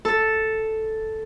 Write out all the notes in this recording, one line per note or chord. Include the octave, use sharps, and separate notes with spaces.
A4